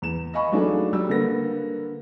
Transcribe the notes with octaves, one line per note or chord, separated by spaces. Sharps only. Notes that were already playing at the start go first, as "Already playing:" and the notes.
E2 E7
D#5 F5 G#5 B5 C#6
F#3 A3 D4 D#4 G#4
F#3 G3 E6
D3 A#3 A4 B4 A#6